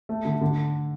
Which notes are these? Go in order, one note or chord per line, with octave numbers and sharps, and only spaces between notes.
A3
D3
D3